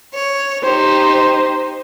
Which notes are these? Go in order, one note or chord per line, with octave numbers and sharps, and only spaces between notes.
C#5
D#4 G4 C5